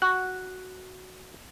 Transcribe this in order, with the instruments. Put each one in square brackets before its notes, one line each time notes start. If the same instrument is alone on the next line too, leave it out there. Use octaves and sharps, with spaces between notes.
[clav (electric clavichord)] F#4 [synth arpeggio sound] F#6